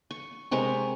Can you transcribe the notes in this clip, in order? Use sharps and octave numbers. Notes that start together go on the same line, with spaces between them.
C#6
C3 G#3 A#4 C#6